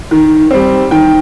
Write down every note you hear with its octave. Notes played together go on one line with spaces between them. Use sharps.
D#3
G3 C4
D#3 G5